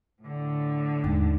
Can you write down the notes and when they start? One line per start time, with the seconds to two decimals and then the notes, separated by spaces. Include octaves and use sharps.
0.22 A2 D3
1.04 D#2 G#2